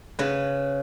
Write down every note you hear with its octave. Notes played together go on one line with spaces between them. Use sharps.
C#3 B4